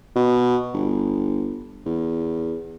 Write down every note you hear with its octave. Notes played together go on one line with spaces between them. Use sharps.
B2
G1
E2